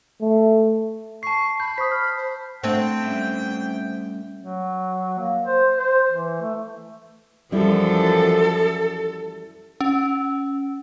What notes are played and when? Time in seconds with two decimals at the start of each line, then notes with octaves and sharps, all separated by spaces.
0.21 A3
1.23 A5 C#6 C7
1.60 B5 G6
1.78 C5 C#6 D#6 B6
1.91 F6
2.17 C5
2.64 A3 C4 D4 F#5 G5
3.01 G3 C#4 E5
4.42 F#3
5.19 A#3
5.46 C5
5.78 C5
6.11 E3
6.41 A3
7.52 F#2 E3 F3 G3 E4 A4
9.81 C#4